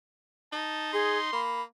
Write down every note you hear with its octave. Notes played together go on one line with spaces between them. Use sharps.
D#4 A5
G#4 C6
A#3 B5